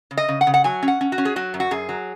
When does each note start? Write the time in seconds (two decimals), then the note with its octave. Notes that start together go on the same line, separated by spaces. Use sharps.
0.11 C#3
0.17 D#5
0.28 C#3
0.41 F#5
0.47 C#3
0.54 F#5
0.64 F#3 G#5
0.83 C#4
0.88 F#5
1.01 C#4
1.12 F#4
1.18 C#4
1.25 G#4
1.36 F#3 F#4
1.54 F#2
1.60 F#4
1.71 F#2 G#4
1.89 F#3